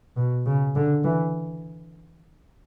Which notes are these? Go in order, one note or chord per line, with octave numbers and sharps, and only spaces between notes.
B2
C#3
D3
E3